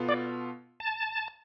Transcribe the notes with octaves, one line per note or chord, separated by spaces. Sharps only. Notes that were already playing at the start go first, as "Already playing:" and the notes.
Already playing: B2 B3 F4 A4
D5
A5